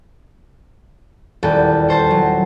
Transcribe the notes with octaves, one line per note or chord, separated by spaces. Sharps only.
D#1 E2 G3 A4 A5 G6
A4 C5 A5 C6
F#3